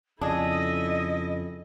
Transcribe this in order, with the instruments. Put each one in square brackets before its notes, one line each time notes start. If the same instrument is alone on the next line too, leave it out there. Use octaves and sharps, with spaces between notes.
[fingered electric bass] F2 C#3 [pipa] D4 G#4 [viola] E4 A4 [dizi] D#5